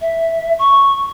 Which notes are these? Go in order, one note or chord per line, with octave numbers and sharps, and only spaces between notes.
E5
C#6